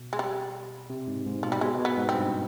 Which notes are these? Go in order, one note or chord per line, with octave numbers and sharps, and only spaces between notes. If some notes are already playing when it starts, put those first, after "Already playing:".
Already playing: B2
G#3
G3
C3
G#2
G#2
B2 F3
G3
B2 G#3
B2
B3
G#2
C4
G2